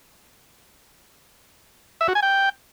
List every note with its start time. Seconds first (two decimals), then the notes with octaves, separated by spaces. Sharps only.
2.01 E5
2.08 F#4
2.15 G#5
2.22 G5